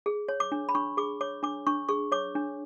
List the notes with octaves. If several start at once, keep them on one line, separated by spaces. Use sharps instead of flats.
G#4
C#5
D6
D4
B5
D4 C#6
G#4 D6
C#5 D6
D4 D6
D4 C#6
G#4 C#6
C#5 D6
D4